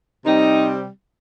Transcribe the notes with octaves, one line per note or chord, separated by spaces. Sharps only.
C3 G3 C4 D#4